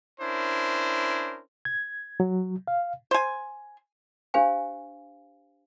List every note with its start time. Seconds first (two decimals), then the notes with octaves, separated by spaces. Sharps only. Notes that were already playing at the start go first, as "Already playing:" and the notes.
0.20 C#4 D4 E4 A#4 C5
1.65 G#6
2.20 F#3
2.68 F5
3.11 C5 G#5
4.34 D4 G4 C5 F5 G#5